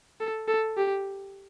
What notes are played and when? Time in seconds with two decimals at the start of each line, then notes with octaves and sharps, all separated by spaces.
0.20 A4
0.48 A4
0.77 G4